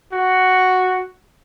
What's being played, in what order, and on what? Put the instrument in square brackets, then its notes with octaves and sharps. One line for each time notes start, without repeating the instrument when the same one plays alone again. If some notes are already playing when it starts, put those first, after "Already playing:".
[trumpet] F#4